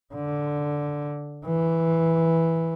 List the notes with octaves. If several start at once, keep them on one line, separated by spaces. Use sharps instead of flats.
D3
E3